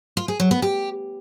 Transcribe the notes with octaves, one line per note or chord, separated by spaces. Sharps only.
F4
G#4
F#3
B3
G4